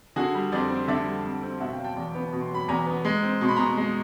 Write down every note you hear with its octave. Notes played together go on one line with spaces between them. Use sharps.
D3 F#4 G#4
G3
F2 C5 D5
C4
D3 D5 E5
G3
F2
C4
B2 E5 F#5
F5 G5
F#3
G5 A5
E2
B3
B2
C6
F#3 B5
E2 G#5 A#5
B3
G#3
C4
B2 C6
B5
B2 A#5 C6
G#3